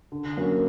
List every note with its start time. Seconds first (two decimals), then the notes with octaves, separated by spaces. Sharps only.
0.12 D3
0.37 F#3 A#3 C#4